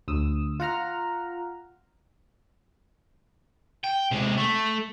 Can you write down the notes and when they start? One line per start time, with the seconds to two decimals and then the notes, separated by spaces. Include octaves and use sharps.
0.08 D2 D#6 E6
0.60 F4 F#5 A#5 F6
3.84 G5
4.11 C3 G#3
4.38 A3